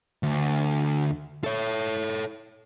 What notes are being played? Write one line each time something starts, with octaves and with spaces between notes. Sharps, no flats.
D2
A4 C#5